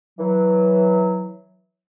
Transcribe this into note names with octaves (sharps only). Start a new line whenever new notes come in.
E3 F#3